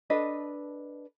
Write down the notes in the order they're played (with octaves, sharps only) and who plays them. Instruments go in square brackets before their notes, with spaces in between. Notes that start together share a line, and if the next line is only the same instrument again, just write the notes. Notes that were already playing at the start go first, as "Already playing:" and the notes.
[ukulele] D4 A4 B4 D#5